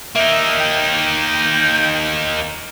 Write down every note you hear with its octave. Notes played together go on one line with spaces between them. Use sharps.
A#3 D#4 E5
G5